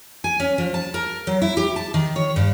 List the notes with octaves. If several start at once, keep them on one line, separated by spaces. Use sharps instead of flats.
G#5
C#4
F3
A5
A#4
F#3
E4
G4
A5
D#3
C#5
G2